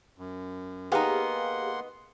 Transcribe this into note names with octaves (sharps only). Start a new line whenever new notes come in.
F#2
A#3 B3 D#4 G4 G#4 F5 F#5 C6